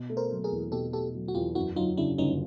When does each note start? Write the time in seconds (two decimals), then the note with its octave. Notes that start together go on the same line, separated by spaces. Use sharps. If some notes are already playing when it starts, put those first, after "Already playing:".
Already playing: B2
0.10 A3
0.17 A#4 C5
0.31 F#3
0.44 G#4 A#4
0.52 E2
0.72 B2 G4 A4
0.93 A3 G4 A4
1.15 F#3
1.28 F#4
1.35 E2 F4 G4
1.55 F#2 E4 F#4
1.76 F#3 D#4 F4
1.97 C#3 D4 E4
2.18 G1 C#4 D#4